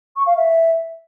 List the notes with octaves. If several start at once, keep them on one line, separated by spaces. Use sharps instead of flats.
C#6
F5
E5